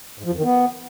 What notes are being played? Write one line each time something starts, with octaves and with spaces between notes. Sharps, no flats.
G#2
F3
F2
D#3
B3